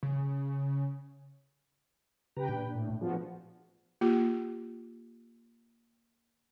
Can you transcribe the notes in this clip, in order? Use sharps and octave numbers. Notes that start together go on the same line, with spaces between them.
C#3
C#3 G4 B4 G5 A#5
A#2 D4
A2
F3 B3 D4 F#4 G#4
A#3 F4 G4